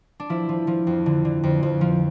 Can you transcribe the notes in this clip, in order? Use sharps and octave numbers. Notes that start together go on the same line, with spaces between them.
D4
F3 E4
F3
F3
F2
D3
D3
F2
F2
F3